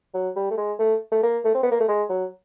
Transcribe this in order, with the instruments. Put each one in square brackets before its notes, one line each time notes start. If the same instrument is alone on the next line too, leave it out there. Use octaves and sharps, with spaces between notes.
[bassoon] F#3
G3
A3
G#3
A3
A3
A#3
A3
C4
B3
A#3
A3
G#3
F#3